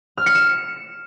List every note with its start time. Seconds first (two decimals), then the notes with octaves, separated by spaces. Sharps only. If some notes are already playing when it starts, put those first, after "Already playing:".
0.17 F6
0.26 C#7
0.35 E7